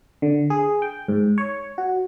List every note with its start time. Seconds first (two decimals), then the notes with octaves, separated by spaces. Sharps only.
0.22 D3
0.50 G#4
0.82 G5
1.08 G#2
1.38 C#5
1.78 F#4